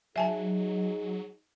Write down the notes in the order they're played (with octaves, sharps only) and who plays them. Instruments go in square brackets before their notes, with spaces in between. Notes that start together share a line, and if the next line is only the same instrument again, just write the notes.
[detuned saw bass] F#3 [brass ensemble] D#4 G#4 [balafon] E5 G#5 A5